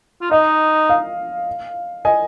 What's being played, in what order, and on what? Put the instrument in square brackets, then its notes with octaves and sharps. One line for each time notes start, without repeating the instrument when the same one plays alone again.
[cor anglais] F4
[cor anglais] D#4 [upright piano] D#5
[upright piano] F5
D#5 G#5